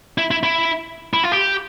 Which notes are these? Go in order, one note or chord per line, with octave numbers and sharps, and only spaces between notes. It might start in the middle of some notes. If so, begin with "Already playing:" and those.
E4
E4
E4
E4
F4
G4